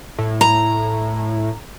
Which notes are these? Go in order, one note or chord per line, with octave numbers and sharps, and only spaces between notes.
A2
A#5